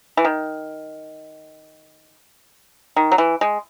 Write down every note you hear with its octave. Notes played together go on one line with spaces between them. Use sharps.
E3
D#3
D#3
F#3
E3
G#3